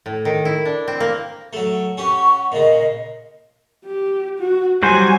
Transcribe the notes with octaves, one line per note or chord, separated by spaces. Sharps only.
A2
D#3
E4
D4
C4
A#3
F#3 A3
C#4 G4 F#5 C#6
A#2 C#3 D#5 F5
G4
F#4
F#3 G3 C5 G#5